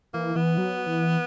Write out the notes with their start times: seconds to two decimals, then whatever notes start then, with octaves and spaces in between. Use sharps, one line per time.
0.14 E3 A#3
0.36 E3 B3
0.58 F#3
0.87 E3